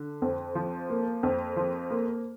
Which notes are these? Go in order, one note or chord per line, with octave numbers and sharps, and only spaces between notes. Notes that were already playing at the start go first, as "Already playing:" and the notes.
Already playing: D3
F2
F3
A#3
F2
F3
A#3